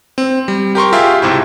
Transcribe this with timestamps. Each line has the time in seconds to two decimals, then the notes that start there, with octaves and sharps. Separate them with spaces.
0.18 C4
0.48 G3
0.75 G4 A#4 C6 C#6
0.93 F4 G4 G#4 E5
1.22 C#2 G#2 C3 E4